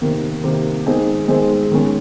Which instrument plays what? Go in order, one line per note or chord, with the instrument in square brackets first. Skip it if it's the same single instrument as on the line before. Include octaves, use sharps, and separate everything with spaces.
[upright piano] C3 D#3 A#3
C3 D#3 A#3
D#3 G#3 C4 D#4 G#4
D#3 G#3 C4 D#4 G#4
D#3 G#3 C#4